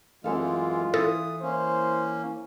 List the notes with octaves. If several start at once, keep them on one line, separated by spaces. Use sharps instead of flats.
F#2 E3 G#3 C4 F4 A4 F5
E3 A4 D#6
A#3 C#4 C5